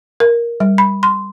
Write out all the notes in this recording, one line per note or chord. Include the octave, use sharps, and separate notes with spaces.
A#4
G3
B5
C6